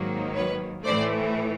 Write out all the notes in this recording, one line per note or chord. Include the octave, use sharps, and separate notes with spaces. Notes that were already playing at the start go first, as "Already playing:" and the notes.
Already playing: G#2 D#3 F#3 A#3
B4 C#5
A2 E3 A3 C5 D5